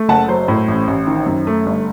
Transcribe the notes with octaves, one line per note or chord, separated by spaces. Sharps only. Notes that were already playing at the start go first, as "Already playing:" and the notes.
Already playing: A3
F#1 F#5 A5
F#3 C5
A2
A1
A1
D#3
F#2
A3
G1